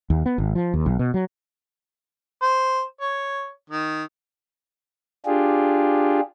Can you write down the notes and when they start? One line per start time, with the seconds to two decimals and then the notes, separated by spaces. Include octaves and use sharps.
0.10 D#2
0.26 B3
0.38 G#1
0.55 F3
0.74 D#2
0.86 B1
0.99 B2
1.14 F#3
2.42 C5
3.01 C#5
3.70 D#3
5.26 D4 F4 G4 G#4